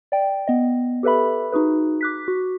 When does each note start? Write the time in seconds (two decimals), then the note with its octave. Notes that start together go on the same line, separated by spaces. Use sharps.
0.12 D5 G5
0.47 B3 D#5
1.03 G4 A4 B4 E5 B5
1.52 D#4 F#4 G#4 B4
2.01 D6 F#6 B6
2.28 F#4